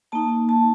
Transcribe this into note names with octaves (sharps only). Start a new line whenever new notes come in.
A#3 D#4 A5
A5